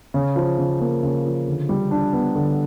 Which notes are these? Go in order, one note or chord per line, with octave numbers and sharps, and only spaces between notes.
C#3
F3
C#3
A#3
C#3
F3
D3
G3
D4
B3
D3